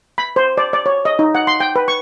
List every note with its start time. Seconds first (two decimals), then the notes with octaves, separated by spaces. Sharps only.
0.18 B5
0.36 C5
0.58 D5
0.73 D5
0.86 C#5
1.05 D#5
1.19 D#4
1.35 F#5
1.47 C6
1.60 G5
1.76 B4
1.88 C#6